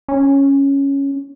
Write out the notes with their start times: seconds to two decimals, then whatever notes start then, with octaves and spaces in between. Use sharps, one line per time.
0.08 C#4